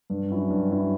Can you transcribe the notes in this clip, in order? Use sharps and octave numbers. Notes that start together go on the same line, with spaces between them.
G2
F#3 C#4 E4
G2
F#3 C#4 E4